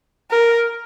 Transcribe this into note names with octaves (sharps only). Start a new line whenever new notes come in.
A#4